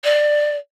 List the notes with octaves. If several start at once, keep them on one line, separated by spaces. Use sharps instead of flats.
D5